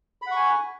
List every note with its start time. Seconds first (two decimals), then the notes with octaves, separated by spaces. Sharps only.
0.22 B5
0.27 F#5
0.31 C#6
0.36 G#5